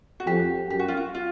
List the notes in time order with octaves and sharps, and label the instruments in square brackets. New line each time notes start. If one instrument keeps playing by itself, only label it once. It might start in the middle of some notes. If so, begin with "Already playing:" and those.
[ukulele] F#4
[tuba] F2 [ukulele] G4
[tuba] F#2 [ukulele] G4
[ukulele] F#4
F4
F#4
F4